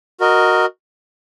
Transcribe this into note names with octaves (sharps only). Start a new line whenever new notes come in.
F#4 A#4 D#5